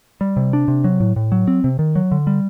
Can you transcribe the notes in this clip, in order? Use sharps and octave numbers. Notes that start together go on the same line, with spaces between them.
G3
C3
D4
C3
F#3
A2
A2
F#3
C4
C3
D#3
F#3
D3
G3